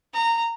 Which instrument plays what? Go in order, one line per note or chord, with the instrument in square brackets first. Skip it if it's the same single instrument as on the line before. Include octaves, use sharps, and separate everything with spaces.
[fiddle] A#5